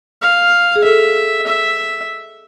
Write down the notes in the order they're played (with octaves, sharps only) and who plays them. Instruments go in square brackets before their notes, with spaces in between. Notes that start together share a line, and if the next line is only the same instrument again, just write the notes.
[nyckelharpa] F5
[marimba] G#4
[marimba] A4 [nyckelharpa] E5
[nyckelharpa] E5